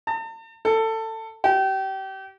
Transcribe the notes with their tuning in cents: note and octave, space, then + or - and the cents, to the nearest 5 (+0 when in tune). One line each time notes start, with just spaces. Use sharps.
A5 +45
A4 +20
G4 -30